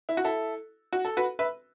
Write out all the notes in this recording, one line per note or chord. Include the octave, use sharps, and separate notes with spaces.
E4
F#4
E4 A4
F#4
A4
F#4 B4
B4 E5